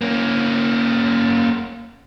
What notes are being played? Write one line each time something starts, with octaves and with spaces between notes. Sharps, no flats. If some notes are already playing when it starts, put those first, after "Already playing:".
A#3 C#4